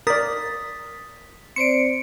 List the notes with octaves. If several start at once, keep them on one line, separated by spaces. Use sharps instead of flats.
A#4 D5 D#6 A6 B6
C4 C5 D5 C#7 D7